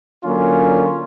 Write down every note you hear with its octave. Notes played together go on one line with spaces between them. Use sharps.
D3 F#3 A#3 C#4 F4